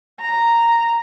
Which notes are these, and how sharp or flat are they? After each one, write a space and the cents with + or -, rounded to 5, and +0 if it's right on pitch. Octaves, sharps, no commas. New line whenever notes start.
A#5 -5